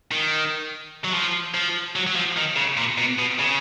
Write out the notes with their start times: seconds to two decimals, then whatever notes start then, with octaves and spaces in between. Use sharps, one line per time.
0.11 D#3
1.04 F#3
1.14 F3
1.54 F3
1.96 F#3
2.07 F#3
2.16 F3
2.37 D#3
2.57 C#3
2.77 A#2
2.98 B2
3.19 B2
3.40 C#3